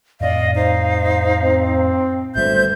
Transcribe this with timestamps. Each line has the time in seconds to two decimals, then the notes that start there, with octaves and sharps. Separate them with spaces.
0.21 F2 A2 D5 D#5 F5
0.56 D#4 C5 F5
1.42 C4
2.36 G#1 D2 G3 B3 C5 E5 G6